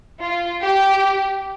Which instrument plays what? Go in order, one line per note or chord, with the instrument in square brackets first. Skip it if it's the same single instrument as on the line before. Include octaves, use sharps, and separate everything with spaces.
[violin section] F4
G4